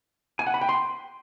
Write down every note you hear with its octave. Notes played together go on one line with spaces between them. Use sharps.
G#5
F#5
B5
G5
C6